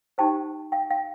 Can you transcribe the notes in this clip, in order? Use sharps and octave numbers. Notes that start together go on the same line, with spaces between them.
D#4 G4 C5 G5 A5
F5 G5
F5 G5